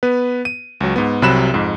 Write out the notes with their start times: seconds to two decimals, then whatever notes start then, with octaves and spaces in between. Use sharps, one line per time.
0.03 B3 B4
0.45 D#7
0.81 C#2 F#3
0.96 G#2 B3
1.22 C2 C3 F#3 B5 F#6 E7
1.54 F2 G#2